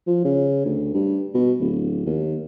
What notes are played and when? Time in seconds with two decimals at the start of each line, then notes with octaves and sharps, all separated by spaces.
0.07 F3
0.24 C#3
0.65 D2
0.94 G2
1.34 B2
1.60 D1
2.06 D#2